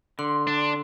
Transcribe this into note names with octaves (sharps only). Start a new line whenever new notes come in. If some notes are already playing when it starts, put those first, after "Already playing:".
D3 C6
D4